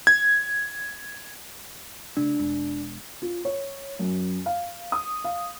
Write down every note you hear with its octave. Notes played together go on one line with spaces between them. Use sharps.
G#6
C#3 A3 D4
E1
F4
C#5
F#2
F5
D#6
F5